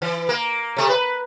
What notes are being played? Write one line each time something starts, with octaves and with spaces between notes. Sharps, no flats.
E3
A#3
C3 A3
B4